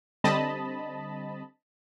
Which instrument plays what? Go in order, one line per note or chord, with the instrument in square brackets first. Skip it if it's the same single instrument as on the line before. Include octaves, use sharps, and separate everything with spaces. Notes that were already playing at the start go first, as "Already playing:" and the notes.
[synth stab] D3 G3 C4 D#5 A5 B5